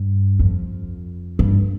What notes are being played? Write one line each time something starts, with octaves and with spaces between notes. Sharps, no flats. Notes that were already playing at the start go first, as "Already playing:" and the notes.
Already playing: G2
F2
G2